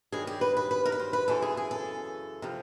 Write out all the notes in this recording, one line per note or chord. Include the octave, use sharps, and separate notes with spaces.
G2 D#3 F#3 G#4
G4
B4
B4
B4
A#4
B4
C5
B4
F#2 C#3 E3 A4
G#4
G#4
A4
C3 F3